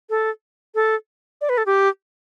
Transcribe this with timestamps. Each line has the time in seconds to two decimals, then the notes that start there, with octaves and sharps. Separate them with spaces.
0.10 A4
0.75 A4
1.41 D5
1.49 B4
1.58 A4
1.66 G4